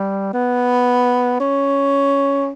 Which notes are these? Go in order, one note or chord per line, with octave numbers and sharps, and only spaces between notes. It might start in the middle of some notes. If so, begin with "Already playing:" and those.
Already playing: G3
B3
C#4